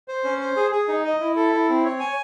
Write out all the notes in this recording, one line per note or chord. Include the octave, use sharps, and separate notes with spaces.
C5
C#4
C5
G#4
G#4
D#4
D#5
E4
A4
E4
C4
C#5
G#5